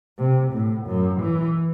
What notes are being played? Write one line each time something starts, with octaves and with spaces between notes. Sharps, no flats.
C3
A2
F#2
E3